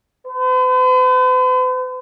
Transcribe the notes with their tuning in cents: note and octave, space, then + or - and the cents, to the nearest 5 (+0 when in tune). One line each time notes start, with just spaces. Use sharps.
B4 +45